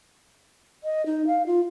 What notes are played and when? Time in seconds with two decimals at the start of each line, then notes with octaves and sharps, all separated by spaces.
0.84 D#5
1.06 D#4
1.27 F5
1.46 F4